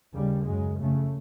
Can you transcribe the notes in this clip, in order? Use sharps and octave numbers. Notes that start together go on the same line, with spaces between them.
D#2 C#3 G3
F#2 C#3 G#3
F2 C#3 A3